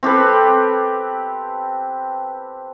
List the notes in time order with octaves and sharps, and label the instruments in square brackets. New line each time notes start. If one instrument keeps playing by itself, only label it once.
[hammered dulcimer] C4 G4 A4 B4